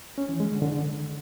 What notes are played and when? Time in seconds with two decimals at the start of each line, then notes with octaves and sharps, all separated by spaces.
0.18 C#4
0.29 E3
0.40 G#3
0.51 D3
0.62 D3